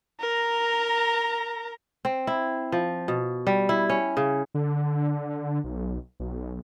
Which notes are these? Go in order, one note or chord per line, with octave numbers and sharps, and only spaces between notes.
A#4 A#5
C4
E4
F3
B2
G3
E4
C#4
C#3
D3
B1
B1